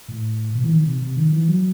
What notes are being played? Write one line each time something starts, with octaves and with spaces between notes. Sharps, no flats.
A2
B2
E3
D#3
C3
C3
D#3
E3
F#3